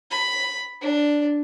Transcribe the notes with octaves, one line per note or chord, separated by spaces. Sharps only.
B5
D4